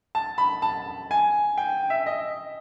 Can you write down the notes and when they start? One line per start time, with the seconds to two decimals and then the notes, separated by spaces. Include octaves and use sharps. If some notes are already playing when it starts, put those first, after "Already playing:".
0.15 A5
0.38 B5
0.62 A5
1.11 G#5
1.58 G5
1.90 E5
2.06 D#5